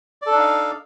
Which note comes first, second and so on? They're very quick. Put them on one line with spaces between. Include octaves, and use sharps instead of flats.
D5 A4 D4 D#4 F5